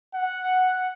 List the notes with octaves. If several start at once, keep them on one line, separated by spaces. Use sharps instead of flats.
F#5